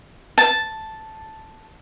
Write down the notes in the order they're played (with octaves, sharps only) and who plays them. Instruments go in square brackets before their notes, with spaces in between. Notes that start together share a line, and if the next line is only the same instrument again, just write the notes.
[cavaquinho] A5